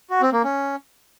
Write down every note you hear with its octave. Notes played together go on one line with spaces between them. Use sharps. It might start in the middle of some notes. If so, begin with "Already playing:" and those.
F#4
C4
A#3
C#4